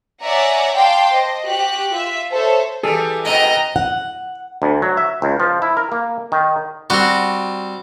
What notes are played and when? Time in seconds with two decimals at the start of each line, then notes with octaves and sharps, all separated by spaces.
0.22 C#5 D5 E5 F#5 G#5 A#5
0.76 F5 G5 A5 C6 D6
1.11 C5 D#5
1.45 F#4 G4 F#6
1.91 F4 E5
2.30 A4 C5 C#5 E5
2.83 E3 G3 G#4 A4
3.25 G#2 B2 D#5 G5 A#5
3.76 F#5
4.62 D2
4.82 F#3
4.97 E5
5.22 C#2
5.40 F3
5.62 E4
5.77 A#4
5.92 A#3
6.32 D#3
6.90 G3 C4 F#4